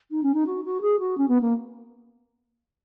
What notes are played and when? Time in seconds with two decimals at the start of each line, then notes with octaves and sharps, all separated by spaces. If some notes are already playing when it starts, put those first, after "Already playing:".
0.11 D#4
0.23 C#4
0.34 D#4
0.46 F#4
0.64 F#4
0.81 G#4
0.99 F#4
1.17 C#4
1.28 B3
1.41 A#3